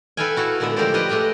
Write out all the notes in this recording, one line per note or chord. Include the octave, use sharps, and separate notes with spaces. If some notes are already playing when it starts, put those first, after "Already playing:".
A4 B4 E5 F5 G5 G#5
E4 F#4 A4 F5
A#2 D3 G#3 B3 E5
F3 A3 G4 A#4 C5 D5
F4 G4 B4 D#5
G#3 A3 D4 D#5 G5